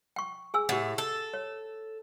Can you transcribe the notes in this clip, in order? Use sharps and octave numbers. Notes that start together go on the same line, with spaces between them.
G5 C#6
G#4 G#5 E6
A2 G4 F#5
A4
C#5